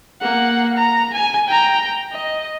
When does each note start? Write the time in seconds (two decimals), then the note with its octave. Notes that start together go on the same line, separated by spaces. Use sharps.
0.21 A#3 F#5
0.77 A#5
1.13 G#5
1.47 G5 A#5
2.12 D#5